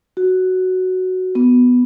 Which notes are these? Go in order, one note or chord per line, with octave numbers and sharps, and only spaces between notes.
F#4
B3